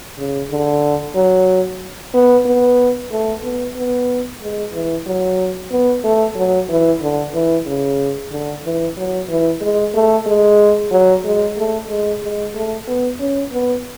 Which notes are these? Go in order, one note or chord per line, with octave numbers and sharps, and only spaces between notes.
C#3
D3
F#3
B3
B3
A3
B3
B3
G#3
E3
F#3
B3
A3
F#3
E3
D3
E3
C#3
D3
E3
F#3
E3
G#3
A3
G#3
F#3
G#3
A3
G#3
G#3
A3
B3
C#4
B3